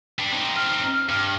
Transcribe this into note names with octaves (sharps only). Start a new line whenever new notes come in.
G3 D4
C4 D#4
F6
G2